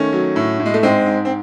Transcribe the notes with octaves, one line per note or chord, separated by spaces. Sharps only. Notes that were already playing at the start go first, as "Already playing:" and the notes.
Already playing: D#3 A3 C#4
F#3
A2
A2
G#3
A3
G#2 G#3 C4
G#2
C4